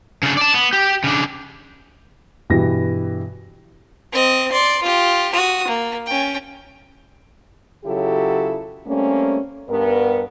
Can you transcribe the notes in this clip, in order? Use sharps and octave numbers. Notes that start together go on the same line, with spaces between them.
C#3 D4
D5 A5
B3
G4
C#3 D4
G2 B2 E3 G3 A#6
C4 D#5
D5 C6
F4 G4
F#4 D#6
A#3
C#4 G5
C#3 F#3 E4 F4 G4 A4
G3 A3 A#3 C4 C#4
G2 B3 A#4